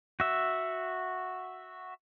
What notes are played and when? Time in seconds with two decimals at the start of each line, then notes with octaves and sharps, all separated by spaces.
0.20 F#4 E5